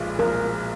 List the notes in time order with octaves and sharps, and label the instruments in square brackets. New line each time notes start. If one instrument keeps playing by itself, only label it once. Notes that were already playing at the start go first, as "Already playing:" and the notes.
Already playing: [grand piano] B1 A#2 F3 G#3
[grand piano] B1 A#2 F3 G#3 [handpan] A#4